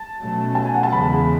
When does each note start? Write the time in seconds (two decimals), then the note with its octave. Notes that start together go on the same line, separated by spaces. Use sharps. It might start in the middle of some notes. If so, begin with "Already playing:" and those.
Already playing: A5
0.19 B2 F#3 A3 C#4
0.55 A5
0.65 G#5
0.74 F#5
0.83 A5
0.91 E2 C#3 G#3 B5